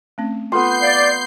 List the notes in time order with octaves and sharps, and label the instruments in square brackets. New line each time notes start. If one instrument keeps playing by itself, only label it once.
[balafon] A3 C4 C#4
[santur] B3 C6 [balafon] F4 A4 [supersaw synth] G6 C7
[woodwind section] D5 [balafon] F5